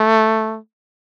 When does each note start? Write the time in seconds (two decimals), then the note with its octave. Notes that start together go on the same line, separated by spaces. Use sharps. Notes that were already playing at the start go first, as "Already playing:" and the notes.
Already playing: A3